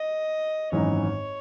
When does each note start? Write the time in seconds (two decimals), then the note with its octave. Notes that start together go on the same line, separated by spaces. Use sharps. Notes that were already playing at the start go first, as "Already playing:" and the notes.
Already playing: D#5
0.72 G#1 F#2 E3 G#3 D#4 C#5